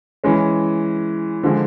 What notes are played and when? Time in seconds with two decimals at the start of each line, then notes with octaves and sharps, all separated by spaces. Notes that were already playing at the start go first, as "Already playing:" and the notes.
0.24 E3 G#3 C#4
1.43 D3 F3 G#3